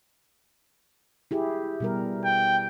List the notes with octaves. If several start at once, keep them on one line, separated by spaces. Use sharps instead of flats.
E4 G4 G#4
B2 G3 A#4
G5